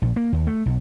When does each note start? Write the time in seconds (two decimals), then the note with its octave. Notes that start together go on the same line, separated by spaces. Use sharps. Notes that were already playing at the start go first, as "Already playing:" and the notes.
0.02 A#1
0.16 A#3
0.33 D#2
0.47 A3
0.66 B1